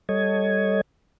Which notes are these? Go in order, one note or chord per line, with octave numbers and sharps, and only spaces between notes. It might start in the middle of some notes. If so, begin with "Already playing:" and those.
G3 A4 C#5 D#5 G#6